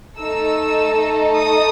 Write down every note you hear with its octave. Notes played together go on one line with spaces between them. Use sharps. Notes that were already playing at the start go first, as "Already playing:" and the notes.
A3 D#4 A4 E6
D#6